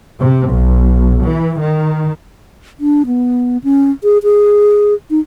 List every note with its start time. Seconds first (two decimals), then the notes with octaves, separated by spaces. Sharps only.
0.19 C3
0.49 B1
1.22 E3
1.60 D#3
2.80 D4
3.06 B3
3.64 C#4
4.03 G#4
4.23 G#4
5.10 D#4